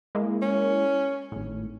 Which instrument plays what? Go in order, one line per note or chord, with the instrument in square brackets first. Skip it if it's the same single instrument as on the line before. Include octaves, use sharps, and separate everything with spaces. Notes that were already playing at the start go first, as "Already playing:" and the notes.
[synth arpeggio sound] G#3 A#3 E4
[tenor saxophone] C#4
[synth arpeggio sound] G#1 A2